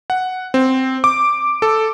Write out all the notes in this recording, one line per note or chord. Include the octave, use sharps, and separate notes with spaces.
F#5
C4
D6
A4